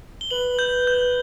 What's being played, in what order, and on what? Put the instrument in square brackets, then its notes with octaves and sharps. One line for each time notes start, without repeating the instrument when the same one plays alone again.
[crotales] G7
[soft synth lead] B4 [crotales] F#7
[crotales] G6
G6